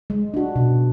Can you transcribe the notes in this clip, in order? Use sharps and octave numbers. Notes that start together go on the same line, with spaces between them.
G#3
D4 F#4
B2